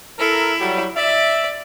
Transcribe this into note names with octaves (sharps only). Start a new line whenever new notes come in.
E4 A4 A#4
F#3 G3
D5 E5